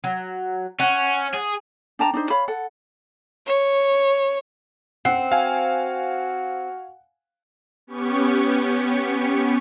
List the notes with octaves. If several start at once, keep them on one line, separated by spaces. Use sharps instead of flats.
F#3
C#4 F#5
G#4
D4 G5 A5 A#5
D4 D#4 C5
C#5 F5 B5
A4 F#5
C#5
C4 F#5 C7
F#4 F5 G#5
B3 C#4 G4 C#6